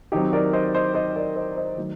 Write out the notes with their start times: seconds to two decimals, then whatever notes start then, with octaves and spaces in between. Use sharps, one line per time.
0.12 D#3 F#3 C4 D#4 G4
0.33 A#4 D5
0.53 C5 D#5
0.75 C5 D#5
0.94 C5 D#5
1.16 A#4 D5
1.36 C5 D#5
1.56 C5 D#5
1.77 D#3 F#3 A3